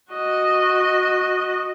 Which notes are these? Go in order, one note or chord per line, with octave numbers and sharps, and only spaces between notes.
F#4 D#5